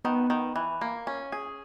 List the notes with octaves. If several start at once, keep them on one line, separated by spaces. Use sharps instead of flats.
D#3 B3
D#3
E3
A#3
C#4
G#4